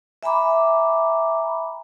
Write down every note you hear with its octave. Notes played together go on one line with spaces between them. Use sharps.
E5 G#5 A#5 B5 D6